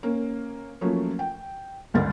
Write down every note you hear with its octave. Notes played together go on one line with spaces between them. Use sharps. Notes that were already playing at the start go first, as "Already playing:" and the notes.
A#3 C#4
F3 F#3 A3 A#3 C#4
G5
G1 C#2 G#2 D3 A#4 A6